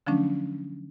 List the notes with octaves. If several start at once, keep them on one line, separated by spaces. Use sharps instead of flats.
D3 F3 F#3 A3 C#4 D4